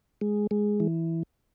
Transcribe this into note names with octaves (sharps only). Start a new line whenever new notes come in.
G#3
G#3
E3